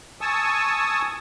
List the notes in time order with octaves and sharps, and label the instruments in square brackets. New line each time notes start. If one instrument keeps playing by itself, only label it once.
[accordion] G#5 A5 C#6 D#6 E6